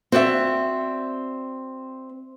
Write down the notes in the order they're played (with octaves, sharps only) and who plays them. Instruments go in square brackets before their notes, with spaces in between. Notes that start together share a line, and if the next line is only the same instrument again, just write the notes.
[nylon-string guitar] C4 F#4 D5 E5